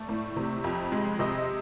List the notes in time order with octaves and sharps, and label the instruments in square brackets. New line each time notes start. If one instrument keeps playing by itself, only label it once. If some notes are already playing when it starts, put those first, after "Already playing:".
Already playing: [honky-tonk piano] A3 D5
A2
C3
F2
G#3
C3 D#5